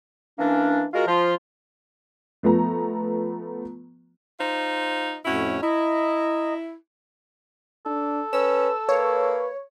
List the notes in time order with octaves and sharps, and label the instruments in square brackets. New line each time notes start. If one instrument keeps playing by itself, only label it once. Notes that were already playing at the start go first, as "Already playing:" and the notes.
[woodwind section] E3 A#3 C#4 D4
G#3 F4 F#4 A#4
F3 F4
[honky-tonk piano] F3 A3 B3 A#5
[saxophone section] D#4 F4 C5
[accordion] F2 A2 [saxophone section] C#4 E4 F#4
[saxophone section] E4 [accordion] D#5 A#5
[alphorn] D4 [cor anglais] A4
[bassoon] C#4 [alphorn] B4 [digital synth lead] E6
[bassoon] A#3 [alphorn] B4 [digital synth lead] C#5